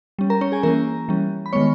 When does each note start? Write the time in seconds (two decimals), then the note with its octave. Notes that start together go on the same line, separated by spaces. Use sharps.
0.19 G3 C#4
0.30 A#4 A#5
0.41 C#4 C#5
0.52 G#4 G#5
0.63 E3 A#3 C#4 A#4 A#5
1.08 E3 G3 C#4
1.46 B5
1.53 D#3 G#3 B3 C#5 C#6